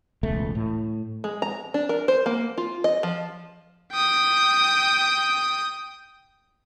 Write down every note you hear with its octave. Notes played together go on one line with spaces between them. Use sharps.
E1 C#2 A3
A2
G#3
A#5
D4
A#4
C5
A#3
F4
D#5
F3
G5 D#6